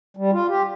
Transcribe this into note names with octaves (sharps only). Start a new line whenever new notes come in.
G3
F4
G4